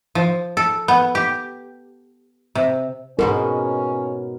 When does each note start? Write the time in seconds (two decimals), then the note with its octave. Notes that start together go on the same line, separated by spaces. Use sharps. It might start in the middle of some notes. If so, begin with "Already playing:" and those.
0.15 F3
0.57 A4
0.88 B3
1.15 G4
2.55 C3
3.19 G#2 B2 B3 C#4 A#4